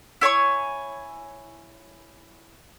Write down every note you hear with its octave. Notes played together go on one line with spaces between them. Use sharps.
E4 C#5 G#5 C#6